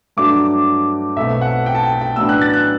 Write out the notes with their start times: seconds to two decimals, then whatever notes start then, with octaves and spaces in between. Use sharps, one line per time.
0.17 G2 F#3 A3 D4 D6
1.17 B1 B2 A3 C4 E5
1.41 F#5
1.66 G5
1.75 A5
1.84 G5
1.93 A5
2.01 G5
2.16 A1 A2 F#3 B3 D4 E6
2.29 F#6
2.42 A6
2.53 F#6